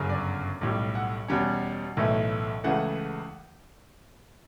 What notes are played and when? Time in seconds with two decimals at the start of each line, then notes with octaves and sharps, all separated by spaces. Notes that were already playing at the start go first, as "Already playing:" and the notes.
Already playing: G1 F#2 C#3
0.09 D5
0.61 B1 A2 G3
0.95 F#5
1.28 E2 B2 G3 C#4
1.97 B1 A2 E3 A3 E4
2.64 C#2 C#3 E3 A3 F#5